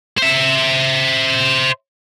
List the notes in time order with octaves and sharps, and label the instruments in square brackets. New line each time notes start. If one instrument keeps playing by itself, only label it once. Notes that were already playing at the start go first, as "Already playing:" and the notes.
[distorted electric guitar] C5 E5